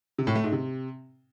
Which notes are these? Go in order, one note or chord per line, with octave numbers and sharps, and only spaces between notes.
C3
A2
A3
G#2
C3